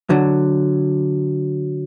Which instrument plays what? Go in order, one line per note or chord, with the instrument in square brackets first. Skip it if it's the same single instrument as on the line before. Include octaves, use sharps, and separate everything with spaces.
[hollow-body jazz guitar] D3 F#3